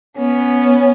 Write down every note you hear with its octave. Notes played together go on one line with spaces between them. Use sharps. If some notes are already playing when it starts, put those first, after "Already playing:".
B3 C#4